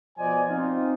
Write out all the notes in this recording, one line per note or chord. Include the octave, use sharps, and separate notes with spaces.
B2 F3 C5 D5 D#5 G#5
C4 D#4 F4